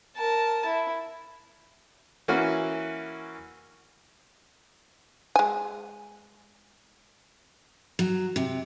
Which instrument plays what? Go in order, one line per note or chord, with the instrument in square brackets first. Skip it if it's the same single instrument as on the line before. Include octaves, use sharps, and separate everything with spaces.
[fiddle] A#4 A5
E4
[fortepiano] E3 A#3 C#4 F#4
[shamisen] G#3 G#5
[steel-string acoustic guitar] F#3
C3